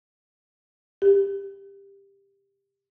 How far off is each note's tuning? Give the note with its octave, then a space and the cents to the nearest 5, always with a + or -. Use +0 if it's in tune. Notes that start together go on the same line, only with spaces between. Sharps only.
G4 +15